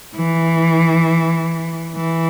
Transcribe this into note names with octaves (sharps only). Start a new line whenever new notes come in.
E3
E3